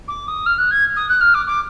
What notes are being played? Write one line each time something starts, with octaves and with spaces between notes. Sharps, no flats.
D6
D#6
F6
F#6
G#6
D#6
F#6
F6
D6
D6